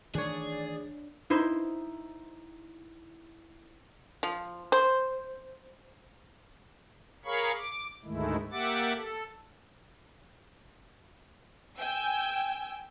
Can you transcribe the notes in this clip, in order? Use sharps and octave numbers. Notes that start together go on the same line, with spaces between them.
D#3 E3 A3 D4 G#4 C#5 D5
D#4 E4 C5
F3
C5
G#4 A#4 C#5 F5 B5 C#6
D6
D2 G#2 D#3 G#3 A3 E4
A#3 G4 E5 F#5 D6 A6
A4
G5 G#5 E6